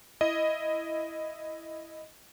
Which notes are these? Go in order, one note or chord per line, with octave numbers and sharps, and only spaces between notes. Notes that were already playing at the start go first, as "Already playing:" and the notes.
E4 D#5